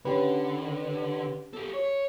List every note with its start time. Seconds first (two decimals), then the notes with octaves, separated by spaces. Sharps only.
0.05 D3 C#4 G4 B4
1.53 G4 A4
1.73 C#5